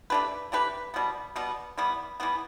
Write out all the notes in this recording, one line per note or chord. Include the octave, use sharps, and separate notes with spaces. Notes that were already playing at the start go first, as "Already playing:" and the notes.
A3 D4 G4 B4
A3 D4 G4 B4
B2 G3 B3
B2 G3 B3
E3 G3 B3
E3 G3 B3